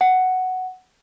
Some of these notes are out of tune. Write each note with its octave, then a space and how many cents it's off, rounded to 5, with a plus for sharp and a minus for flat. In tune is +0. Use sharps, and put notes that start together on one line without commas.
F#5 +5